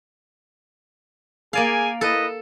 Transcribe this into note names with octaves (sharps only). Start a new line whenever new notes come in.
A#3 G#4 D5 F5 G#5
E4 A4 B4 D#5